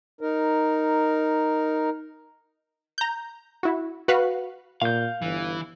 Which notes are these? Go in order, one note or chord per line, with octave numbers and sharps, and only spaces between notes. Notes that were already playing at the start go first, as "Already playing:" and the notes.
D#4 A#4
A#5 G6
E4 F#4
F#4 B4 F5 F#5
A#2 F5 G6
G1 E3